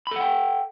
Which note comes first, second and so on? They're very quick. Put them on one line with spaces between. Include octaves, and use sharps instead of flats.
B5 A4 F#5 G5